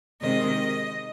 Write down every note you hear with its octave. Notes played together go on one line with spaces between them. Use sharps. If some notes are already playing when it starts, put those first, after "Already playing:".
C3 D#3 G#3 C4 D#5